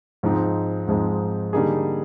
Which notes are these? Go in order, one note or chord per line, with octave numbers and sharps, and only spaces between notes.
G#2 F3 G#3 C4 D#4
G#2 F3 G#3 C4 D#4
D3 G3 A#3 D#4 G#4